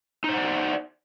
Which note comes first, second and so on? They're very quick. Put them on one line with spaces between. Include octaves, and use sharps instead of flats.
D#4 C5 F#5 D5